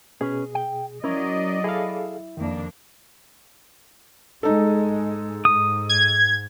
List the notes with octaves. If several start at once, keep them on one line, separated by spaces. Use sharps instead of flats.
B2 C#4 G#4 B4
G5
F#3 C#4 E4 A#4 D5 D#5
E4 G#4 A4 F5
F2 D#3 A#3 D4
G#2 G#3 D#4 A4
G#2 D#6
G#6